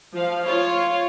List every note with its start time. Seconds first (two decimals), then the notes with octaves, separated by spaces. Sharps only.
0.13 F3 F5
0.43 F4 C#5